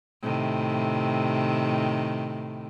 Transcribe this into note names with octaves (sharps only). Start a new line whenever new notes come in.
A2 C3 D#3